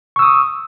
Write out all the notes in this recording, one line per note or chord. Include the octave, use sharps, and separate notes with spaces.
C#6 D#6 E6